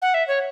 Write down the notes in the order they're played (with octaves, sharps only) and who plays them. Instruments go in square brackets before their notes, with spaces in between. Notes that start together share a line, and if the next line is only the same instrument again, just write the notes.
[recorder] F#5
E5
C#5